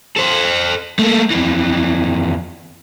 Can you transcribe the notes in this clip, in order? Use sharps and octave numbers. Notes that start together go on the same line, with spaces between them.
A4 C5
A3 A#3
F2 E3